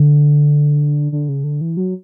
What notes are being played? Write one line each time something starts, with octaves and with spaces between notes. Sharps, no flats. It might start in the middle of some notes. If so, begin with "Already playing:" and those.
Already playing: D3
D3
C#3
D3
E3
F#3